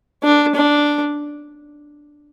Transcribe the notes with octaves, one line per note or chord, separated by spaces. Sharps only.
D4
D4